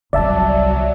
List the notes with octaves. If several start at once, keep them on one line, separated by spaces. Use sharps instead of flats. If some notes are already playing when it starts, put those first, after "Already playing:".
G1 C2 F#3 G3 D5 E5 A5